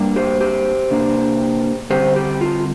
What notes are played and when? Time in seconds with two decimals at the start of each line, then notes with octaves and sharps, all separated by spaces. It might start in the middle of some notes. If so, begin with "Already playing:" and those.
Already playing: G2 G3 A#3 D4
0.16 G4 C5
0.41 G4 C5
0.91 C3 A#3 D4
1.90 D3 G3 C4 G4 C5
2.16 G4
2.41 F4